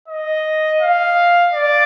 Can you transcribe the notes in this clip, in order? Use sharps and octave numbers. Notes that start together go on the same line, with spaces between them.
D#5
F5
D5